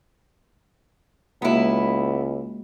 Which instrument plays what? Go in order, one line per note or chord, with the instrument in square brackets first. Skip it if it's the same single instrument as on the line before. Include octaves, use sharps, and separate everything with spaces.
[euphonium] C#2 [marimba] G#3 A#3 F#4 [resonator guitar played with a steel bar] B3 E4